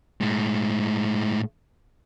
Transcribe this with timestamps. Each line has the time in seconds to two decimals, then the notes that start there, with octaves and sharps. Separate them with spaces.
0.21 A2 G#3